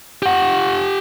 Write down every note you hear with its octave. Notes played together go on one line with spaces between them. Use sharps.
G4 F#5